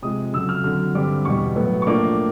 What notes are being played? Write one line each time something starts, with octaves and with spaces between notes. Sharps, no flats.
C3 F3 G#3 D#6
F2 C#3 F#3 E6
F6
F2 D3 F#3 F6
G2 D3 G3 C4 D6
E2 B2 G3 C#6
A2 F#3 B3
C#6
A2 F3 A#3 D4 D6